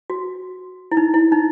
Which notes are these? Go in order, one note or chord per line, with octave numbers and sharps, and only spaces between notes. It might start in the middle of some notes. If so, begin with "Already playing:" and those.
F#4
E4
D#4
E4
D#4